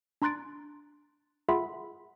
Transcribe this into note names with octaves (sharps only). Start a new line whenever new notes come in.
D4 A#5 C6 F#6 A6 D7
F4 G#4 E5 F#5 B5 C6